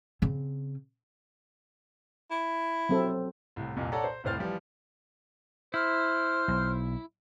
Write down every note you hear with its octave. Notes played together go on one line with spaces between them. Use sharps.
C#3 C4
E4
F#3 C4 A4
C2 A2
C2 F2 A#2
A4 C#5 D5 F#5 A5 A#5
C5
F1 C2 A2 C5 F6 A6
E3 F3 G3
E4 C5 F6
B1